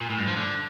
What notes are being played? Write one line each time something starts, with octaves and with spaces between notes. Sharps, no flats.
A#2
A2
G2
F3
D3